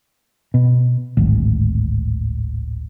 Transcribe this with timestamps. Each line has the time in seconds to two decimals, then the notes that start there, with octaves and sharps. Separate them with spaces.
0.54 B2
1.17 D1 G#1